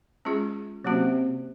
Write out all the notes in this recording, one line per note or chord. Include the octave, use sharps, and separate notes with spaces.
G#3 C#4 F4 G#4
C3 F#3 A#3 C#4 F#4